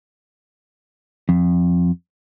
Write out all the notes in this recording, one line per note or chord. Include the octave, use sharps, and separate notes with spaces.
F2